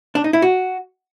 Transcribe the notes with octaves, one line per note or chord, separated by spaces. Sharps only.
D4
D#4
E4
F#4